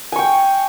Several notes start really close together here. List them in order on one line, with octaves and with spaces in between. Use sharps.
G#5 C#6 G5